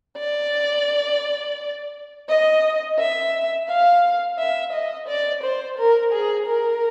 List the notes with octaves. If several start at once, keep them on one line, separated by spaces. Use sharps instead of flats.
D5
D#5
E5
F5
E5
D#5
D5
C5
A#4
G#4
A#4